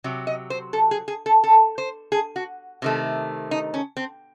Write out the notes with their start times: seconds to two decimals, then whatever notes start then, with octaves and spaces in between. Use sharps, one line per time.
0.04 C3 F#3
0.27 D#5
0.50 C5
0.73 A4
0.91 G#4
1.08 G#4
1.26 A4
1.44 A4
1.78 C5
2.12 G#4
2.36 F#4
2.82 C3 D#3 A3
3.51 D#4
3.74 C#4
3.97 C4